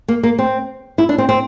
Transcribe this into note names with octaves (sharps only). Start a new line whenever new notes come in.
A#3
A#3
C4
E4
D4
C4
C4